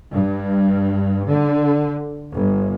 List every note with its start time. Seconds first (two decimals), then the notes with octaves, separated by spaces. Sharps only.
0.12 G2
1.27 D3
2.32 G1